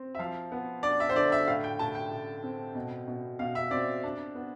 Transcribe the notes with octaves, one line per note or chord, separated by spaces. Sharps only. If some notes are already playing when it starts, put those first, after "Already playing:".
Already playing: C4
E5
F3 F5
B3
D4 D5
E5
C5
D3 D5
E5
A2 F5
G5
A2 A5
G5
A2
C4
B2
B2
B2 F5
E5
C4 D5
D4
B3